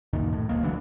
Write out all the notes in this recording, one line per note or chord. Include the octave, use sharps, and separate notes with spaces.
C#2 F#2 A#2 D#3
A2
E1 C#2 G#3 A#3
D3 E3 F#3 D4